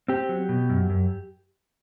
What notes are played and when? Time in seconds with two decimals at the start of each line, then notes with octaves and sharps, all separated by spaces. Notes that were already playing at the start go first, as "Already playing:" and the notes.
0.08 C4 G4
0.29 F#3
0.49 B2
0.69 F#2
0.90 F#2